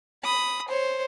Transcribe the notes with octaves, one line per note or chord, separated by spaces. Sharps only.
B5 D#6
C5 C#5